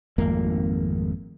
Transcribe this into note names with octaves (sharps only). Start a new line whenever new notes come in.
G#1 F2 A3 A#3